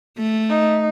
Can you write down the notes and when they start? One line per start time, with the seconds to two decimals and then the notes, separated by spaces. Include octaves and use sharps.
0.18 A3
0.49 D#4